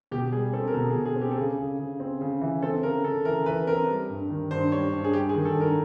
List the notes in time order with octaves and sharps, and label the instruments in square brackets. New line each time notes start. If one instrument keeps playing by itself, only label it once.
[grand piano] B2 [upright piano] G4
[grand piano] G3 [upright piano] G#4
[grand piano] C4 [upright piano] A4
[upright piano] A#4
[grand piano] B2 [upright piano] A4
[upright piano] G#4
[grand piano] B2
[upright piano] G#4
[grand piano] C4
[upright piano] G4
A4
[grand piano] C#3 [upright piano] G#4
[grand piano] C#3
C#3
C4
C#3
E3
[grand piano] C4 [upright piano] A4
[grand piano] C#3 [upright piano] A#4
[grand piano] C#3 [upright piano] A4
[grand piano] E3 [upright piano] A#4
[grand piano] E3 [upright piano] B4
[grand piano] C4 [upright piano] A#4
[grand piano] G3
G2
D#3
[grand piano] G2 [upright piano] C5
[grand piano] G3 [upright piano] C#5
[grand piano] G2
[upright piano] G#4
[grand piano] G3 [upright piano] G4
[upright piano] G#4
[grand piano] D#3
[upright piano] A4
[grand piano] G2
[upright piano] A#4